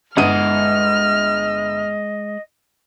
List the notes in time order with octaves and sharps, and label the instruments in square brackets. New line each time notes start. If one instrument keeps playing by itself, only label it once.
[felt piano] G1 D#6 D#7 [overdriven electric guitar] G#3 F#5 [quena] D#5 [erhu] F6